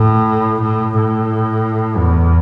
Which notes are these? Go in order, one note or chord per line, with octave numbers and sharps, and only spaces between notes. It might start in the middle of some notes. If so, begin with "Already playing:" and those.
Already playing: A2
A2
A2
E2